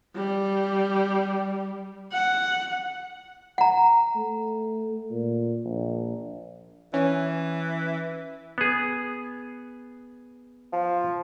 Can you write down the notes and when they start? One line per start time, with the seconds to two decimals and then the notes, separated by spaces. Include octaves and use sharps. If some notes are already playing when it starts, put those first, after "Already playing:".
0.15 G3
2.12 F#5
3.58 F#5 A#5
4.15 A3
5.11 A#2
5.65 A#1
6.94 E3 C#4
8.58 B3 G#4
10.73 F3